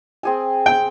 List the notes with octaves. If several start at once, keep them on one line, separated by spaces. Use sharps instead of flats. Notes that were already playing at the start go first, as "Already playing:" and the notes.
C4 G#4 G#5
G5